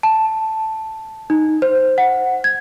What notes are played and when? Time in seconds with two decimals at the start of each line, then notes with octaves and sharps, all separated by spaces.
0.03 A5
1.30 D#4
1.62 C5
1.98 F#5
2.44 G#6